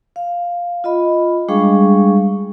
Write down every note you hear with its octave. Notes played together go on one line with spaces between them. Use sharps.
F5
F4 D#5 B5
G3 G#3 D4 G#4 F5 C#6